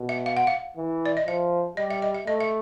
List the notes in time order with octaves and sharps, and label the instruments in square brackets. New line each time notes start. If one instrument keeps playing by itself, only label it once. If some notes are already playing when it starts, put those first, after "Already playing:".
Already playing: [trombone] B2
[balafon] E5
F5
F#5
F5
[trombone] E3
[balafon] D5
D#5
[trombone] F3 [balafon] E5
[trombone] G3 [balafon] D#5
[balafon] E5
D#5
E5
[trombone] A3 [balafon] D#5
[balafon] E5